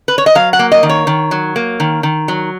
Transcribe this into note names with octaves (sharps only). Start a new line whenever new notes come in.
B4
C#5
D#5
F#3 F5
F#5
A#3
D#5
D#3
C#5
D#3
F#3
A#3
D#3
D#3
F#3